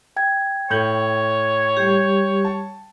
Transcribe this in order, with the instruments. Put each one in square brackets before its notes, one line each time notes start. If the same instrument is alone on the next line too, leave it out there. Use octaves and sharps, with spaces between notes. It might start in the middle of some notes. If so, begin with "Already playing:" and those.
[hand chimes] G5 G#6
[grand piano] A2 G6 F#7 [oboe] C#5
[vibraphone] G3 G4
[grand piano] A5